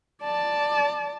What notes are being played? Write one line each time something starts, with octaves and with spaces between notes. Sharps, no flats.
D5 A5